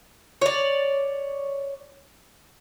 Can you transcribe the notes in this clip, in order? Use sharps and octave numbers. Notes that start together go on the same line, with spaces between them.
C#5 D5